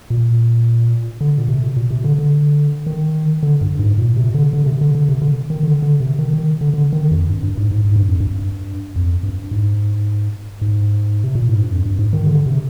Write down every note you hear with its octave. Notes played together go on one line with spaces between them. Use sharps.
A#2
D3
A#2
C3
A#2
C3
D3
D3
D#3
D3
G2
G#2
A#2
C3
D3
D3
C3
D3
D3
C3
D3
D#3
D3
D3
C3
D#3
D#3
D3
D3
D#3
F2
G2
G2
G#2
G#2
G#2
G2
F2
G2
F2
G2
G#2
G#2
C3
A#2
G#2
G2
F2
G2
G#2
D#3
D3
C3